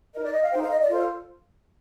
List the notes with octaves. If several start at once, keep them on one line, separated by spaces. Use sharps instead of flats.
A#4 D#5
D#4
D5
D#5
F5
D#4 A4 C5 G5
F5
D#5
D5
F4 A4 C5 D#5